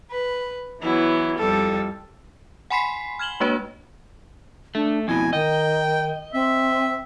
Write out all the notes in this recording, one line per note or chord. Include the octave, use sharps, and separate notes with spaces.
B4
E3 F#3 B3 E4
F2 G3 A4
F#5 G#5 B5 C6 B6 C7
F6 G#6 E7 F#7 G7
G#3 A#3 D4 F#4 B4 C#5
A3 D4
F2 B2 E4 G#5
D#3 D#5 G5
C4 E5